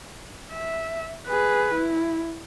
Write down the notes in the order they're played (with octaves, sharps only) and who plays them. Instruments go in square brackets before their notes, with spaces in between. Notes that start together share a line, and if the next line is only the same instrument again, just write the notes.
[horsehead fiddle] E5
G#4 B4
E4